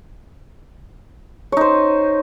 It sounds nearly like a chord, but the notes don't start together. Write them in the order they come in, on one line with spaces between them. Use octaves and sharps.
C#5 D#4 C5